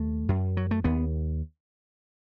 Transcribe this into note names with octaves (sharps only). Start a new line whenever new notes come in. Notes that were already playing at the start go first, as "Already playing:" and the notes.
Already playing: D#2 A3
F#2
F#3
A3
D#2 B3